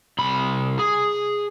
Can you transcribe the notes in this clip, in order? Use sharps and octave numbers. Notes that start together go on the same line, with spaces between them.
C2 B5
G#4